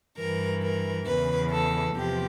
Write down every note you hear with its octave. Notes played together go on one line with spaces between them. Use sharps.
G2 E3 A#4
A#4
E2 C#3 E3 B4
A4
E2 C3 F3 G4